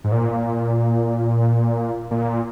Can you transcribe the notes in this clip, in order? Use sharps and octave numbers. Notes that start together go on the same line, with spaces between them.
G#2
A#2
A#2